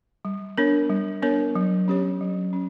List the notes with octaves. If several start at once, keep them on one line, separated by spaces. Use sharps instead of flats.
G3
B3 D4 A#4 C#5
G3
B3 D4 A#4 C#5
F#3
C#4 G4 C#5
F#3
C#4